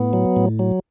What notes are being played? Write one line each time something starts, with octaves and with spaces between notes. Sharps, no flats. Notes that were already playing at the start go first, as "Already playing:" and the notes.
Already playing: A2 B3
F#3
A2
F#3